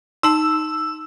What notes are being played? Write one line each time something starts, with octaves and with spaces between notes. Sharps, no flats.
D#4 A5 E6